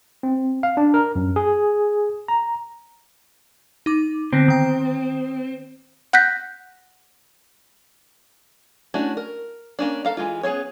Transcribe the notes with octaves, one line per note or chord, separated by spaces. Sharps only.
C4
F5
D4
A#4
F#2
G#4
A#5
D#4 D6
D3 B3 C4 A#6
D#3 G5 D#6
F#5 F#6 G6 A#6 B6
A3 C#4 D4 E4 F#4
A#4
A#3 C#4 D4
A4 F5 A#5
E3 G#3 F4
B3 C#4 G#4 A4 C#5